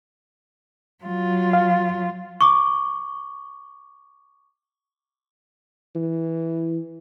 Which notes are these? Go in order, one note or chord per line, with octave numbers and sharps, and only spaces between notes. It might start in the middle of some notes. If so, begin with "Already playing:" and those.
F#3 F4
F5
C#6 D6
E3